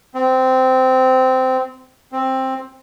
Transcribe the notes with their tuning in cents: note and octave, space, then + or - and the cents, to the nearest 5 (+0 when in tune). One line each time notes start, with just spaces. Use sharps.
C4 -15
C4 +10